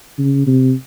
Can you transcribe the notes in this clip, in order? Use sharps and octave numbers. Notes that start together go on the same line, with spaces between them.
C#3
C3